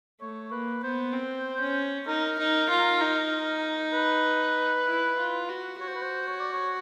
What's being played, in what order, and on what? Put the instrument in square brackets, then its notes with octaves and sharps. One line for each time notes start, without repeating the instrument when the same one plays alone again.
[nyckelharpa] A3 [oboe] C#5
[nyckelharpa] A#3 [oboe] B4
[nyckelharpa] B3 [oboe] C5
[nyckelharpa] C4
C#4
[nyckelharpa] D#4 [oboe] A#4
[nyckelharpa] D#4
F4
D#4
[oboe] B4
[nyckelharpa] E4
F4
F#4
[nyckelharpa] F#4 [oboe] C#5
[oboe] C5
B4
C5
C#5
D5
C#5